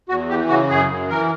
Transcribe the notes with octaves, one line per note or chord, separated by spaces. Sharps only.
E2 F#4
E3 G4
C#3 F#4
F#2 G#4
F#2
E3 A#4